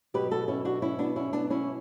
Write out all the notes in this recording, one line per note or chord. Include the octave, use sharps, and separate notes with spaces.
B2 F#3 G4 B4
F#4 A4
C#4 E4
D4 F#4
C#4 E4
B3 D4
C#4 E4
B3 D4
C#4 E4